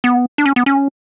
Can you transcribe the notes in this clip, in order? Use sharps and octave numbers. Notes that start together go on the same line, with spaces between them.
B3
D4
C#4
B3
C#4